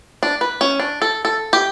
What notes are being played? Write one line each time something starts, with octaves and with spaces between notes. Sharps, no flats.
D4
B4
C#4
D4
A4
A4
G4